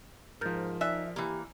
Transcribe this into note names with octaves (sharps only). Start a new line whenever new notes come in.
G#2 F3 A#4 F6 G6 A6
D#4 D5 E5 G#5 F#6
E3 A#3 G4